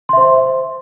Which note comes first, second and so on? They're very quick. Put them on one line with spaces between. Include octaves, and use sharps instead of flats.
C6 E5 C5